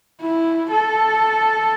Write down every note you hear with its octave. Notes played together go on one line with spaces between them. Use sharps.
E4
A4